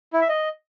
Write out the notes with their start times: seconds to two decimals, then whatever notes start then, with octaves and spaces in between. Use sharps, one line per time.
0.13 E4
0.21 E5
0.29 D#5